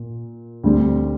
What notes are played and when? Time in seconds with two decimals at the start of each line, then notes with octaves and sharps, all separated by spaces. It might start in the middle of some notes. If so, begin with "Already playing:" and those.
Already playing: A#2
0.64 D2 D3 G3 C4